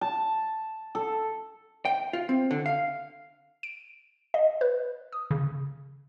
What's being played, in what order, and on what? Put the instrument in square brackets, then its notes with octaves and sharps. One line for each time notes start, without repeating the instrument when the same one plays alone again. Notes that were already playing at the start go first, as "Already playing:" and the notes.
[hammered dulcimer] A5
A4
[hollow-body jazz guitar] G5
F4
C4
D3
F5
[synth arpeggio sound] D7
D#5
B4
D#6
C#3